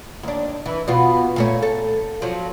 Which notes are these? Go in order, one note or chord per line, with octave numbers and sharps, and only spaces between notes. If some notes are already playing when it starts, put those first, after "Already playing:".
D#2 D4
E3
B2 B3 F4
A#2 A3 C#4
A4
F3 F#3